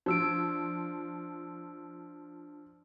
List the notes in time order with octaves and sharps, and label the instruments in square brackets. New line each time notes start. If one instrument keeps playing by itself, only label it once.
[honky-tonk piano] F3 [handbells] D4 E6 D7